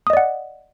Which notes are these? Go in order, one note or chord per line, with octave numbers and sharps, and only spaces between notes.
D5 D#5 F#5 D#6